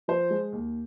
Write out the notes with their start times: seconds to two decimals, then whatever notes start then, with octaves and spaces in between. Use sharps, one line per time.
0.08 F3 C5
0.30 G#3
0.52 D#2